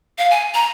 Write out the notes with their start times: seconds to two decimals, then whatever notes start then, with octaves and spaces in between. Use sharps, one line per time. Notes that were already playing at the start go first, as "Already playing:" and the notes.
0.18 F5
0.31 G#5
0.55 A#5